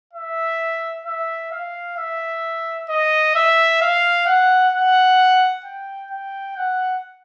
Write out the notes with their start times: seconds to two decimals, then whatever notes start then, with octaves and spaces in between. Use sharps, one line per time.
0.13 E5
1.05 E5
1.51 F5
1.97 E5
2.89 D#5
3.35 E5
3.81 F5
4.26 F#5
4.73 F#5
5.64 G5
6.11 G5
6.57 F#5